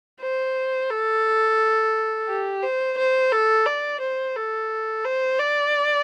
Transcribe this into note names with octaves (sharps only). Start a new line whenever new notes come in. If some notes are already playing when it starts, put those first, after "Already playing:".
C5
A4
G4
C5
C5
A4
D5
C5
A4
C5
D5